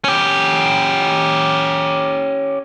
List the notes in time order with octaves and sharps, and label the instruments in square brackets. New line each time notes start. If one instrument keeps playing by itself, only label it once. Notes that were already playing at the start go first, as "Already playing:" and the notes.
[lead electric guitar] C#4 G4